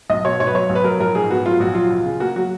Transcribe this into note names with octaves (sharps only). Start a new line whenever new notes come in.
B1 D#5
B2 C#5
B1 C#5
B4
F#3 C#5
B1
B4
F#3 A#4
A#1 A#4
G#2 G#4
B3 F#4
F#3 F4
A#1 F#4
F#3 F4
C#2
C#3
A#3 F#4
F#3 F#4